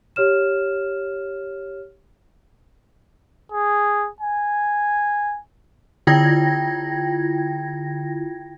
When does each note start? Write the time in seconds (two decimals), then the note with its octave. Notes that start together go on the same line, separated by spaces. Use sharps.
0.16 G4 C#5 F6 E7
3.52 G#4
4.21 G#5
6.07 D3 E4 F4 G5 G#6 A#6